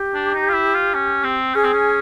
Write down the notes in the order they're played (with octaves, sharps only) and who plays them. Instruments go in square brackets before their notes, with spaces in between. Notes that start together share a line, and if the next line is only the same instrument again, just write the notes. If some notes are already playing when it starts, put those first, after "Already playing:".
Already playing: [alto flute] G4
[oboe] D4
D#4
F4
E4
F4
C#4
C4
[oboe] C#4 [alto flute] G#4
[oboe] C4
C#4